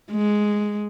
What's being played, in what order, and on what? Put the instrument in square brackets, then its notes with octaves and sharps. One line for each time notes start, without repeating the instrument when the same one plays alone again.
[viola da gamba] G#3